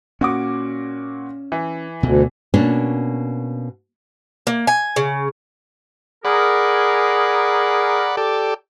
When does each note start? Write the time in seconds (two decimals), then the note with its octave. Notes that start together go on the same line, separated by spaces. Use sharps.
0.21 A#2 C#4 F#4 D6
1.52 E3
2.03 D2 B2
2.54 B2 A#3 C#4 D4
4.47 A#3
4.67 G#5
4.96 C#3
6.25 G#4 A#4 D5 F#5 B5
8.17 G4 A4 D5